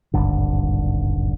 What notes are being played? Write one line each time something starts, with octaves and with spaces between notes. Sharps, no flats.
D#1 G#1 G2 D3